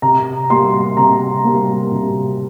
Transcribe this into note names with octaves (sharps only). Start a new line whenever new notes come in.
C3 A#5
G3 A#3 C6
C3 A#5
G3 A#3
C3